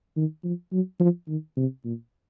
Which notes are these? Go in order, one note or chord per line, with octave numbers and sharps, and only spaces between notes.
D#3
F3
F#3
F3
D#3
C3
A#2